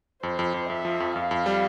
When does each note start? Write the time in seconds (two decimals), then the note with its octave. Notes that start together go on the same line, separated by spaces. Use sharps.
0.23 F2 C5
0.39 F2
0.54 F2
0.69 F2 E5
0.85 F3
1.00 F2
1.15 F2 F5
1.31 F2
1.46 G3